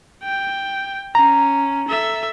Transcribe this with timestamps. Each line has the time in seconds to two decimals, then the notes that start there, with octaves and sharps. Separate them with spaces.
0.24 G5
1.15 C#4 A#5
1.88 A4 E5